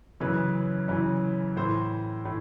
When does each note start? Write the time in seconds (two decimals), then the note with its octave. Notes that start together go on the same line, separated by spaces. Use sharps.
0.20 F#2 C#3 E3 B4
0.88 F#2 C#3 E3
1.56 A2 E3 C5
2.25 A2 E3